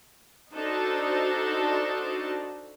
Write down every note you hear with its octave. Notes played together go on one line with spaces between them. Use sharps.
D4 D#4 F#4 A4 C5